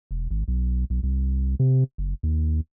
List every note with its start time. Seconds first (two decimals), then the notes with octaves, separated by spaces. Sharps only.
0.11 E1
0.31 G#1
0.48 B1
0.90 B1
1.03 C2
1.59 C3
1.98 F#1
2.23 D#2